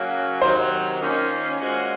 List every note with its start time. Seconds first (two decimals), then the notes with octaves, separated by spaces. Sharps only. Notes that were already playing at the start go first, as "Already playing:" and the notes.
Already playing: C#3 F#3 A#3 C#4 F#4
0.41 C3 D#3 F#3 C5
1.00 D#3 A#3 C#4 F4 C5
1.58 A#2 G#3 C#4 F#4 C5